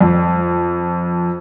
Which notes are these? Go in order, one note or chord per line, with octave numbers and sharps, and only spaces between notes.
F2